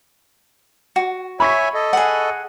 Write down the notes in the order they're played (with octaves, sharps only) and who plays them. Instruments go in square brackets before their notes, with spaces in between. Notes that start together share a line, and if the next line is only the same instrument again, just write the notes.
[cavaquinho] F#4
[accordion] C#5 E5 G#5 [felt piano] B5 C#6 B6
[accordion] A4 D#5
[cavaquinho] G#4 F#5